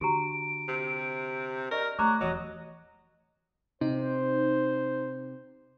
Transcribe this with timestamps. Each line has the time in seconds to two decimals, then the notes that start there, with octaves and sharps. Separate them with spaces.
0.01 D3 F#4 G4 A#5 D7
0.68 C3
1.71 G4 A#4 D5 D#5
1.99 A3 G4 C#5 A#5 D6 F#6
2.21 E1 E3 F#3 D#5
3.81 C3 D#4 C5